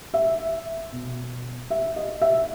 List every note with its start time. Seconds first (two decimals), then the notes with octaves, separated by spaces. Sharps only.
0.14 E5
0.92 B2
1.70 E5
1.96 D#5
2.22 E5